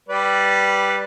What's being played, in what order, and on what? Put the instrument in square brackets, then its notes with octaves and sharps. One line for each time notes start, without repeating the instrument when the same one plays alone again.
[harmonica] G3 B4 D5